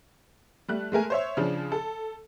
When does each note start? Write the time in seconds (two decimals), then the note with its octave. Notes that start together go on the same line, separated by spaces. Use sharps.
0.68 G3 A3 F#6
0.92 G#3 A3 A#4 G#5
1.10 C5 C#5 E5
1.37 C#3 F3 D4 G#4
1.72 A4